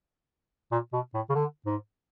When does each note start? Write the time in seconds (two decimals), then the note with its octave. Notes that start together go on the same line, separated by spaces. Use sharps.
0.72 A#2
0.93 B2
1.14 A2
1.30 C#3
1.35 D3
1.66 G#2